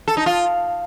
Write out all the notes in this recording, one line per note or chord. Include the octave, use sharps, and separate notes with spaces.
A4
D#4
F4